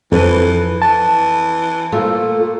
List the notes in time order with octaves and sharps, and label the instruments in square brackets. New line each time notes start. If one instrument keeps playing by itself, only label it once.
[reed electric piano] F2 [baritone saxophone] E3 [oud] A4 B4
[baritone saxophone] E3 [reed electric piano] A5
[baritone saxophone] A#2 [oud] A3 F4